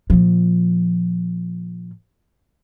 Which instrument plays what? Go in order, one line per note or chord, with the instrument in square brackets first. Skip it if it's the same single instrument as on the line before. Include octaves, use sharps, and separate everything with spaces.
[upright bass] A#2 F3